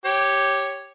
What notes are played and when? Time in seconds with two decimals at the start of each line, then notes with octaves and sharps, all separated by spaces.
0.05 G4 C#5